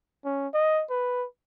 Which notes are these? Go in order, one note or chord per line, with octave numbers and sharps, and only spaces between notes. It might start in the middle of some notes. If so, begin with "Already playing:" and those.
C#4
D#5
B4